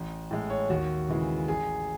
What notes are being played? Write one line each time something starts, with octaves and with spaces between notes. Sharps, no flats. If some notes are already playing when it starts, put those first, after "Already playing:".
Already playing: A1
A2 G#3
C#5
D#2 F#4
C#3 E3 G#3
A1 G#4